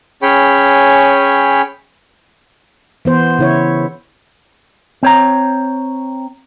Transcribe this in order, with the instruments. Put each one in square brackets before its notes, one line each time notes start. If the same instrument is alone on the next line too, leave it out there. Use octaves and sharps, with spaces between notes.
[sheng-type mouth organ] C#4 G#4 C#5 G5 B5 C#6
[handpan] E3 B3 C5
C#3 E4 C#5
[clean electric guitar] C4 C#5 A#5